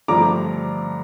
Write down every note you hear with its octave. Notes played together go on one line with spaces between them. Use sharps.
G2 D3 F3 A3 A#5 D6